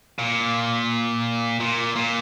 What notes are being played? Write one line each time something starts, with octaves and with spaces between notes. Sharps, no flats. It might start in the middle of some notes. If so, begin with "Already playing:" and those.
A#2
A#2
A#2